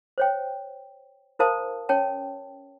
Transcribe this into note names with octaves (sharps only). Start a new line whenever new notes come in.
C5 C#5 G5
E4 A#4 C5 F5 A5 D#6
C#4 C#5 G5 A5